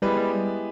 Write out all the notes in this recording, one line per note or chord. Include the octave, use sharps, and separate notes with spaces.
G3 G#3 B3 E4 G4 B4
G3